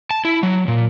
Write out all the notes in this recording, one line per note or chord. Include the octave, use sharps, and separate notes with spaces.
A5
E4
F#3
A#2